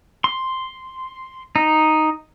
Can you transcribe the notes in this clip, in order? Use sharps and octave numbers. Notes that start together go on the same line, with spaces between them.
C6
D#4